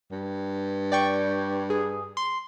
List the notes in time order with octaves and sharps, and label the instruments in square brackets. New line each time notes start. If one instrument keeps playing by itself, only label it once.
[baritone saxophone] G2
[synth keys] D5 G5 C#6
G#4
C6